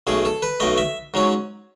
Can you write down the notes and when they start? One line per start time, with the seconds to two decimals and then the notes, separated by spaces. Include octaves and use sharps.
0.07 B1 B2 A3 G#4
0.25 A4
0.42 B4
0.60 B1 B2 A3 D#5
0.78 E5
1.14 G#2 F#3 C#4